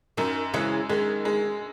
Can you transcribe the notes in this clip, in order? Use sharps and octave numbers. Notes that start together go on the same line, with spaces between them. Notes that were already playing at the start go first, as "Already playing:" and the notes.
F#2 D#3
C#3 E3 G#3
D#3 G#3
G#3